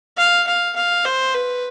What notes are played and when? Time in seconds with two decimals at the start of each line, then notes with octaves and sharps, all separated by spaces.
0.18 F5
0.48 F5
0.76 F5
1.05 C5
1.34 B4